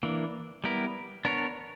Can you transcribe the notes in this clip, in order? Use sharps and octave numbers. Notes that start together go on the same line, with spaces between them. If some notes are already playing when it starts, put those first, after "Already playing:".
E3 A#3 D4
G3 B3 E4 A#4
B3 D4 A#4 C#5